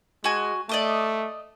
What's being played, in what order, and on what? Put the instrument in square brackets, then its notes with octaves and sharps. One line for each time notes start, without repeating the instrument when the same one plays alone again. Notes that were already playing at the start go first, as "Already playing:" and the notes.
[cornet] G#3 [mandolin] F#4 G#5
[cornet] A3 [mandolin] D5 D#5 D6